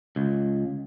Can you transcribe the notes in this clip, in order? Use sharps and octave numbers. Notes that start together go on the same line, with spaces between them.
C#2